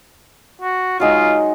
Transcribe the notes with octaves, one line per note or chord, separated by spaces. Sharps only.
F#4
F#3 G#3 D#4 F4